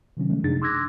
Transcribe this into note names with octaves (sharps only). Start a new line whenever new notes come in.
C3 D#3 F#3 C#4
F3 G#3 A3
F#2 C3 D4 D#4 G#4 A6
C6 D6 E6 F#6 G#6 A#6